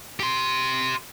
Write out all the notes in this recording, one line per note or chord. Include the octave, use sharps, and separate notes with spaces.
G4 C6